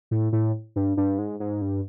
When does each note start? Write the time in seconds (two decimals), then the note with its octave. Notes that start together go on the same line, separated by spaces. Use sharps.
0.11 A2
0.33 A2
0.76 G2
0.97 G2
1.19 G#2
1.40 G#2
1.62 G2